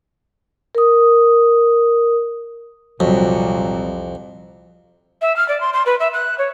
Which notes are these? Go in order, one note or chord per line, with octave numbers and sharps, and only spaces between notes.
A#4 D#6
C2 F2 A#2 F#3
E5
F6
D5
C6
C6
B4
E5
F#6
C#5